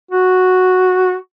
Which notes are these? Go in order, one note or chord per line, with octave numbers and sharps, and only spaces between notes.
F#4